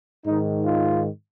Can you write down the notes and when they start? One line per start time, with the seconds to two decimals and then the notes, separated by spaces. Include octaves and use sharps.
0.25 G#2 D#3 D#4
0.66 F4